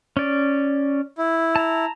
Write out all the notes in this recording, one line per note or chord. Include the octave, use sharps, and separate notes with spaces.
C#4 D5
E4
A5 A#5